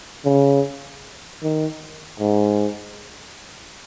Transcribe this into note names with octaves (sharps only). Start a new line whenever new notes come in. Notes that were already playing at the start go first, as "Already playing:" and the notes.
C#3
D#3
G#2